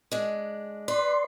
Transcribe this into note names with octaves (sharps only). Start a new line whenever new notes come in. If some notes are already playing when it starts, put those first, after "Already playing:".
G#3 D4
B4 D5 C6